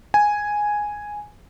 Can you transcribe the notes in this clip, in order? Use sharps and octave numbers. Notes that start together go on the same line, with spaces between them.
G#5